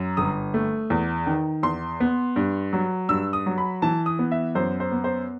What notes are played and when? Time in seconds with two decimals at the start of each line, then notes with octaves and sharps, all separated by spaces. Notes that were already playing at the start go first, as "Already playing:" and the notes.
Already playing: F#2
0.17 G1 D#6
0.54 A3
0.90 E2
1.26 D#3
1.63 E2 C6
2.00 B3
2.36 G2
2.73 F#3
3.09 G2 E6
3.33 D#6
3.46 F#3
3.58 B5
3.82 E3 A5
4.06 D#6
4.19 B3
4.32 E5
4.55 F#2 C5
4.80 C5
4.92 B3
5.04 C5